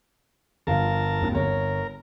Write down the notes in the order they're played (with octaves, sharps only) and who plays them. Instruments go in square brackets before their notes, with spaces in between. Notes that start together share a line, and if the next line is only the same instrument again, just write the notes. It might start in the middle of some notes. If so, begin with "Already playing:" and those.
[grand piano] G1 F3 F5 [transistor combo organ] A#4 A5
[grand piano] G#1 D#2
[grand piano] G1 C#5 [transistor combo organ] A#4